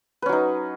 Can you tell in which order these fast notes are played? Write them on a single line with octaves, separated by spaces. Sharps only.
B4 C#4 F#3 D#4